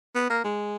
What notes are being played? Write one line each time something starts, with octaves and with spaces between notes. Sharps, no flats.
B3
A#3
G#3